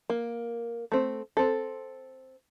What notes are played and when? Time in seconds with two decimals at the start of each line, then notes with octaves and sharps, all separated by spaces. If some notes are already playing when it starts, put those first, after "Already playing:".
0.10 A#3
0.92 A3 C4
1.37 C4 A4